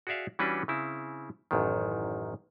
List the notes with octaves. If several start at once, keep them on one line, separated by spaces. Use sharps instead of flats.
F#4 G#4 D5 E5 F5
E3 G3 C#4 D4 F#4 B4
C#3 C4 E4
A1 F#2 D#3